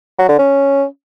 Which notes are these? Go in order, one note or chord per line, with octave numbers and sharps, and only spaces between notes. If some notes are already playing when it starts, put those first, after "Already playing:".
F#3
D3
C#4